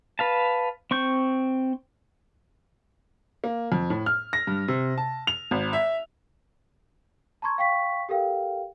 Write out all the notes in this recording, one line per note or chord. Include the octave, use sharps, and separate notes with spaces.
B4 F5 A5
C4 C#6 G6
A#3
F2
A2
F6
A#6
G2
C3
A5
F7
G#1
E5
A5 A#5 C6 C#6 G#6
F5 G5 C#6 B6
G4 A4 A#4 F5 G5